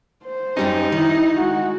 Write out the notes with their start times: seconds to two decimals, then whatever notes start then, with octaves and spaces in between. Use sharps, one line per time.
0.24 C5
0.57 F#2 G3 C#4 D#4
0.92 D#3 E4
1.36 G#3 F#4